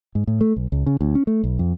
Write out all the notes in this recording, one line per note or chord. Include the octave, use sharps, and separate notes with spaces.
G#2
A2
A3
B1
C#2
C#3
D2
C#4
A3
B1
F2